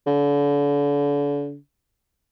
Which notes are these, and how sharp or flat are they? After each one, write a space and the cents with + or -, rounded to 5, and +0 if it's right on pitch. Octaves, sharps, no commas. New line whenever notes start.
D3 -40